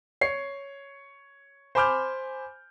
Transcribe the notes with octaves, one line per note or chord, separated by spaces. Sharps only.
C#5 C7
C5 G#5 B5 D6 F6 G6